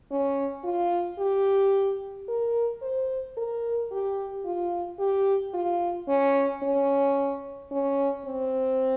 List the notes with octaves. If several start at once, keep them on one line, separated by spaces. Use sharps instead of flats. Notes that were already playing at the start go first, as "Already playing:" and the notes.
C#4
F4
G4
A#4
C5
A#4
G4
F4
G4
F4
C#4
C#4
C#4
C4